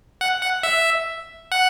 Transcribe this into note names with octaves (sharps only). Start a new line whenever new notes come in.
F#5
F#5
E5
F#5